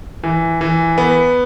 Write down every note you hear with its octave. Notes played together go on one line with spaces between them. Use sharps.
E3
E3
B3